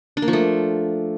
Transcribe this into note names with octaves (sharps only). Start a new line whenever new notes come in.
D4
A#3
F3
A3